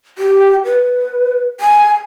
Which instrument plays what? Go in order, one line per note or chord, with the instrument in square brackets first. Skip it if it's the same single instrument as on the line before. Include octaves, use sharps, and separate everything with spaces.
[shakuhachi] G4
B4
G#5